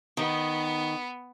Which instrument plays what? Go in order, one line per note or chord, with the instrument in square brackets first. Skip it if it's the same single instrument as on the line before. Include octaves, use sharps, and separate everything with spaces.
[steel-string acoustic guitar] D#3 [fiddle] B3